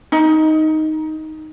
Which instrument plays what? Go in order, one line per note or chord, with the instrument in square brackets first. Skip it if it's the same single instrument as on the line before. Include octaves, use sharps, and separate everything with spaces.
[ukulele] D#4